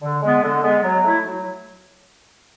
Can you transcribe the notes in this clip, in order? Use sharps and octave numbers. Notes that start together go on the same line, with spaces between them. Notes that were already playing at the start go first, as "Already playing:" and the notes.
D3
G#3 B3
D3
G#3 B3
F#3
A3 E4
F#3